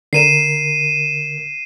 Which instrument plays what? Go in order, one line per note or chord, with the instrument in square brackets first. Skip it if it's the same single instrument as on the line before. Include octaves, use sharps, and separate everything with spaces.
[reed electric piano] D3 A#4 [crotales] C7 D#7 E7